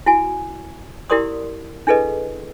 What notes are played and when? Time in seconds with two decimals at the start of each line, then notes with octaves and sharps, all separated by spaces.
0.06 E4 F#4 G#5
1.10 E4 G4 A#4 D5 C6 D#6
1.87 D4 E4 G#4 A4 B4 D#5